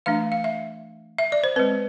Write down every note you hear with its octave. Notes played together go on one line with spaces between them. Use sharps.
E3 A3 D4 F5
F5
E5
E5
D5
C5
G#3 C4 B4